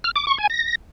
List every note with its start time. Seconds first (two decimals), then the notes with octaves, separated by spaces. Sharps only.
0.04 F6
0.16 D6
0.27 C#6
0.38 G#5
0.50 A#6